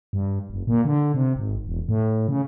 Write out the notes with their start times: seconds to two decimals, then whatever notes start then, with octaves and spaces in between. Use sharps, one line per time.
0.13 G2
0.50 F#1
0.67 A#2
0.85 D3
1.14 C3
1.36 G#1
1.64 E1
1.89 A2
2.28 C#3